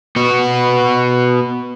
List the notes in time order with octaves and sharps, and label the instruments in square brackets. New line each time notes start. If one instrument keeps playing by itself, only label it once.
[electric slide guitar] B3 F#4